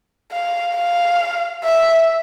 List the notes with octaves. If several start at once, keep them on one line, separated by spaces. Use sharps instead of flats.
F5
F5
E5